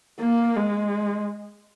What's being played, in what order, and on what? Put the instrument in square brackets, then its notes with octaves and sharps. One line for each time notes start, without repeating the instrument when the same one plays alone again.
[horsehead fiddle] A#3
G#3